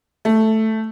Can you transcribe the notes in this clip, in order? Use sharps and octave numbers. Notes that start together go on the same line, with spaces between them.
A3